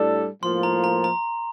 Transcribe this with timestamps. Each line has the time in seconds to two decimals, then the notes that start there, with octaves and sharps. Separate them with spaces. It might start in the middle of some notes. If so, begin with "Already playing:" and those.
Already playing: A2 G3 D4 A4
0.43 A2 F3 A#3 F4 C6
0.63 A#5
0.84 A#5
1.04 A#5